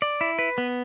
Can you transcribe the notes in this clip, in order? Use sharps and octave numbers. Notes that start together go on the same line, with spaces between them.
D5
E4
B4
B3